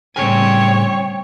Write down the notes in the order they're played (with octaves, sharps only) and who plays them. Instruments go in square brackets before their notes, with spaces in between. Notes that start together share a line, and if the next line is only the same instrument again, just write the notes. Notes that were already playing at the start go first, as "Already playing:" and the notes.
[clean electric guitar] A2 C#3 G#5 [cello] G3 C4 [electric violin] C#5 [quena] G5